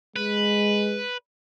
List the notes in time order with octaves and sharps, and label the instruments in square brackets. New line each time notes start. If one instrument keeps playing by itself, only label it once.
[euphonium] G#3 [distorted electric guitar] B4